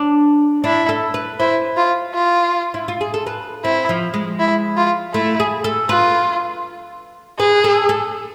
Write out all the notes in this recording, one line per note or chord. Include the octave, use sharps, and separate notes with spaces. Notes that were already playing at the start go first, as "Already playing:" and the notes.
Already playing: D4
D4 E4
A4
B4
E4 C5
F4
F4
E4
F4
G#4
A4
B4
C4 E4
F3
G#3
E4
F4
A3 E4
G#4
A4
F4 B4
G#4 B4
A4
A4